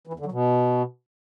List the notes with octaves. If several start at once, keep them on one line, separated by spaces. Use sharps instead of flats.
E3
E2
D3
F#3
B2